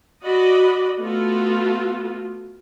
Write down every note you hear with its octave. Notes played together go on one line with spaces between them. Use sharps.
F#4 D5 D#5 B5
A3 B3 F4 F#4 A4